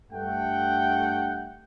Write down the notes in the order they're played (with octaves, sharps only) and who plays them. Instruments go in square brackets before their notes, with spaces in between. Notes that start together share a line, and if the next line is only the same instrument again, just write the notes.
[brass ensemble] G2 A3 F#5 G5